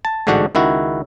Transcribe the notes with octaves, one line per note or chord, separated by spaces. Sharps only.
A5
A1 G#2 D3 D4 F#4 F#5
C#2 D#3 E4 F#4